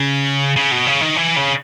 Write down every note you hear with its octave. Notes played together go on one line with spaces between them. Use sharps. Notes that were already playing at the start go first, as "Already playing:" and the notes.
Already playing: C#3
C#3
B2
C#3
D#3
E3
C#3